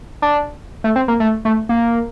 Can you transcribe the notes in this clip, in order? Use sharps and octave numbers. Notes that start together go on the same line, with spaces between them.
D4
A3
C4
A#3
A3
A3
A#3